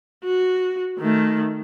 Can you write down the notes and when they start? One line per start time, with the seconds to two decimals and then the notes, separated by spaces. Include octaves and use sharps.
0.24 F#4
0.99 D#3 A3